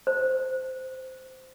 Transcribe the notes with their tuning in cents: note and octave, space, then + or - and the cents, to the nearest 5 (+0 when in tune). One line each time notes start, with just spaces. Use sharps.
C5 -10